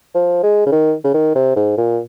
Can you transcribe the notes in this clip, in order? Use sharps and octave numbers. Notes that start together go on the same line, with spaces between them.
F3
G#3
C#3
D#3
C#3
D#3
C3
G#2
A#2